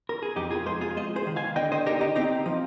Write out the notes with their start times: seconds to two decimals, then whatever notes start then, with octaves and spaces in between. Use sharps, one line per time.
0.09 A#4
0.23 G#4
0.36 F2 D#4 G4
0.51 F4 G#4
0.66 G#3 G#4 C5
0.81 F4 G#4
0.97 G#3 C5 D#5
1.16 G#4 C5
1.27 D#3
1.36 F5 G#5
1.56 D3 D#5 G5
1.72 C5 D#5
1.86 D#4 G4 A#4
2.01 D#4 G4
2.16 C4 D#4 G4
2.46 F3